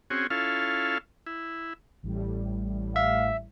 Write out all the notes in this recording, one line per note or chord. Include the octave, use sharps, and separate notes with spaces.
C4 C#4 F#4 G#4
C#4 E4 F4 A4 F5
E4
A1 A2 G3
E5 F5